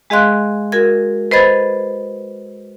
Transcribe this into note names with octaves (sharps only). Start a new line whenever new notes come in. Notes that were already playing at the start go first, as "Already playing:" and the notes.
G#3 G#4 D#5 F5 C6 F#6
F#4 A#4 G#6
B4 C5 D#5 B5 G#6 A6